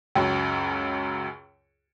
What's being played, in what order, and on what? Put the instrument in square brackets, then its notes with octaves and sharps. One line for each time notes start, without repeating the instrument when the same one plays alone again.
[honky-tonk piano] C#2 F#2